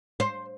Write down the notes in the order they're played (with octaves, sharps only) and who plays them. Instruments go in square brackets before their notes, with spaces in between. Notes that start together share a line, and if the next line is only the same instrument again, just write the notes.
[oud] C5